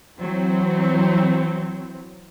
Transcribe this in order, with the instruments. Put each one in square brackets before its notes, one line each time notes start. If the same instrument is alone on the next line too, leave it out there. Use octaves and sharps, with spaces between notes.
[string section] E3 F#3 C4